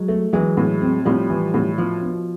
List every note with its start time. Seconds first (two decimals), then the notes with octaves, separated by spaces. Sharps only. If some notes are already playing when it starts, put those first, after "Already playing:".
Already playing: F#3 G#3
0.08 A3
0.33 E3 F#3 G#3
0.57 A2
0.81 C4
1.05 A2 F3 G3
1.29 E3
1.54 A2
1.78 B2 F3
2.03 B2